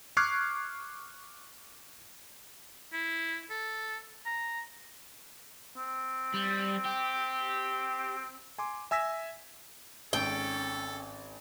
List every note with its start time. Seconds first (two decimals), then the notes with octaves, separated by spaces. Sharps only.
0.17 C#6 D6 F6 F#6 G#6 C7
2.93 E4
3.50 A4
4.26 A#5
5.76 C4
6.34 G3
6.85 G4
8.58 G#5 C6 D6
8.91 E5 G#5 E6 A#6 B6
10.13 G#1 C#4 A4 G5